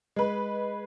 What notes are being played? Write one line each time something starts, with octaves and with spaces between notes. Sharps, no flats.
G#3 B4